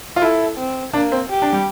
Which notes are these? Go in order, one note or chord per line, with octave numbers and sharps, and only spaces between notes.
F4
E4 A4
C4
A#3 D4
C4
G4
D4
G3